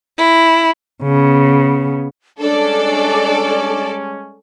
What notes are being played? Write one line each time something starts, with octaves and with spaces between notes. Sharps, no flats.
E4
C#3 B3
G3 G#3 C#4 D4 A4 D5